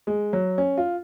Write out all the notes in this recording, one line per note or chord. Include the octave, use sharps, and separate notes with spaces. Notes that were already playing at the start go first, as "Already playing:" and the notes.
G#3
F#3
C#4
F4